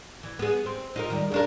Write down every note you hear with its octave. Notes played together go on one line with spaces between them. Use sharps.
E3
B3 G#4
C4
D#4 F4 A#4
D#3 G3
C#3 D4 A#4